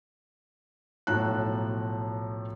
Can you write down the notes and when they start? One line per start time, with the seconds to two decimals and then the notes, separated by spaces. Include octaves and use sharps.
1.07 B1 A2 F3 A5 A#5 F#6